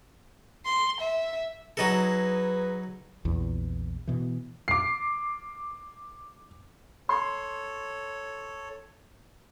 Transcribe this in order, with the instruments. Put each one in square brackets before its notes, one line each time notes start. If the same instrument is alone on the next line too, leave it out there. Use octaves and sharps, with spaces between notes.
[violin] C6
E5
[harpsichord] F#3 D#4 A4 [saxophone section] G#4 B4
[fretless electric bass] A#1 E2
B2 E3
[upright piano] D6 C7
[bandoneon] A4 C#5 [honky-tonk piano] C6